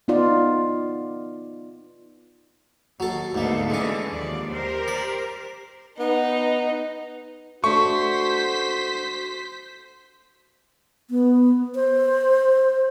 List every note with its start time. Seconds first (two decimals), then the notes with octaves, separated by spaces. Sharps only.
0.08 B3 D#4 F4 D5
3.00 D#2 F#3 A4
3.35 D2 G#2 A#3 B3 A4
3.70 D3 E3 G#3 C#4 A4
4.11 D#2 F3 D5
4.51 G4 A#4 C5
4.88 D5
5.99 B3 D#4
7.64 A3 D4 F#4 C5 C#6 B6
11.10 B3
11.75 C5